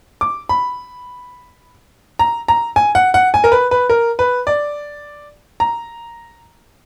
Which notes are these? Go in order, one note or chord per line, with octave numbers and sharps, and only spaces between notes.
D6
B5
A#5
A#5
G#5
F#5
F#5
G#5
A#4
B4
B4
A#4
B4
D5
A#5